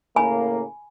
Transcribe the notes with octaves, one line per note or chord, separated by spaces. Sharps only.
A2 C#3 A#3 G#5 B5